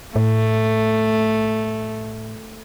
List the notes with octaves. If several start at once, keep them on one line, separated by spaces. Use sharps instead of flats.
A2 A3